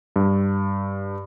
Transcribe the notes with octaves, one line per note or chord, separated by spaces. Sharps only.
G2